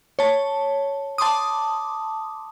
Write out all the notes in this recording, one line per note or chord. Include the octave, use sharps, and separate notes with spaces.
C#5 A5
A5 C6 D6 D#6